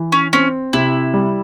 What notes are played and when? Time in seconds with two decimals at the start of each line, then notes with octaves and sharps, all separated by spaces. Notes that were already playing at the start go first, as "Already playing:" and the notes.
Already playing: E3
0.12 C#4
0.33 C4 C#4
0.73 C3 E4
1.14 G3